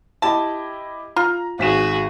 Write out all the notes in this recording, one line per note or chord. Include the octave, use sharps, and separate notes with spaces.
E4 G4 D#5 A5
F4 A#5
G#1 F#4 G#4 B6 E7